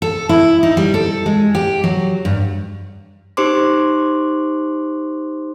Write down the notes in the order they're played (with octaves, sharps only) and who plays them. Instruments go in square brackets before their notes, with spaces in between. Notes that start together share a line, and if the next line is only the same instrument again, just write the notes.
[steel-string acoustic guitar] A4
E4
D#4
G3
A4
G#3
G4
F#3
G2
[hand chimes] D#4 G4 C5 C6 D6